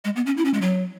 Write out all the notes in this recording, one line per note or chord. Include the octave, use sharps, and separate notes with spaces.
G#3
B3
C#4
E4
C#4
G#3
F#3